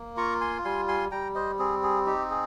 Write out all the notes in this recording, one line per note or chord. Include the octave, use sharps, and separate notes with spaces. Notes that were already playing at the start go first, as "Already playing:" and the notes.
Already playing: A#3
F4 A#5 C#6
G#5 C6
G3 G#5 C6
G#5 C6
G3 G5 A#5
C5 D#5
C4 G#4
G#4
D#4 G4
G#4